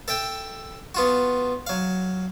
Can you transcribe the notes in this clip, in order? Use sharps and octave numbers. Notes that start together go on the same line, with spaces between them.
A4 E5 G5
B3 F4 F#4
F#3 F5